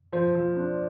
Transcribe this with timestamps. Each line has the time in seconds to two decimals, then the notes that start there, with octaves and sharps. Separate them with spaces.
0.12 F3 C5
0.35 F3
0.57 D4